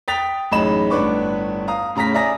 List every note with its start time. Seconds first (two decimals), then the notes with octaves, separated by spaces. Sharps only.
0.08 G5 D#6 A6 B6 F7
0.51 A1 F#2 G#3 D#4 B5 E7
0.90 G1 A2 D4 B4 C#6 D6
1.68 F5 A#5 D#6
1.95 A2 C#3 A#5 A#6 B6
2.14 D5 E5 G#5 A#5 D#6 A#6